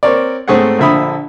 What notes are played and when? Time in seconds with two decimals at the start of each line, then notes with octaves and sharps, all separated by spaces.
0.03 C4 A#4 C#5 D5
0.48 G#2 A3 C4 G#4 C#5 F#5
0.78 A#1 D3 F3 E5 B5 D#6